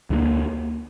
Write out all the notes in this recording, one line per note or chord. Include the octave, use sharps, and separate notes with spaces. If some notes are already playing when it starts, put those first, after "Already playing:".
D2 D3 F3 A#3